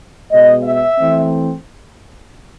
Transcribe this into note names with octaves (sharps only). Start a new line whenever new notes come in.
B2 G#3 B3 D#5
E5
E3 A3 C4